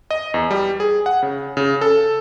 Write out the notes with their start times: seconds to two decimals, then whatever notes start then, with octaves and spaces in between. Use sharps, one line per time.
0.11 D#5
0.34 E2
0.51 G3
0.80 G#4
1.06 F#5
1.23 C#3
1.57 C#3
1.81 A4